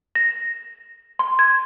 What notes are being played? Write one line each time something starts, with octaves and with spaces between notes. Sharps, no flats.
A#6
C6
G#6